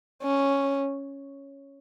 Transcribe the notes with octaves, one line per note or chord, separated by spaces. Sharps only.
C#4